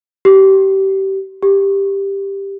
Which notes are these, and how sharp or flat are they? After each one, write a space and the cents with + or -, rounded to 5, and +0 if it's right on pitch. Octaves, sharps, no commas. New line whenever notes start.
G4 -25
G4 +10